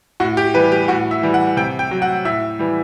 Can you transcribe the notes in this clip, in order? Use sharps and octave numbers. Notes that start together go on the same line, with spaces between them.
A2 F#4
G4
E3 G3 B4
G4
A2 F#4
E5
E3 G3
F#5
C3 G5
G5
F#3
F#5
A2 E5
E3 G3